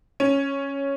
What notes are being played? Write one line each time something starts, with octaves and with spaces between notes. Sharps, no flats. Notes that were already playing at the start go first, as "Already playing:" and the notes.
C#4